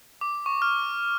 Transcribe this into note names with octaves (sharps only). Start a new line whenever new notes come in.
D6
C#6
F6